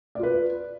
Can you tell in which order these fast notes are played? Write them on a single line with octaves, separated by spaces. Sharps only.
D5 F4 B4